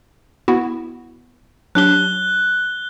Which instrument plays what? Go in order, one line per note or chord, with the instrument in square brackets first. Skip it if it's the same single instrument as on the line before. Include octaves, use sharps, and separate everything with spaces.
[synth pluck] B3 E4 F#4
[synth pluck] F#3 D4 G4 [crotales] F#6 G7